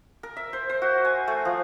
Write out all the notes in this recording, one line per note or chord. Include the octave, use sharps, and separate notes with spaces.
A#4
E5
C5
C5
F#4
G#5
A3
F3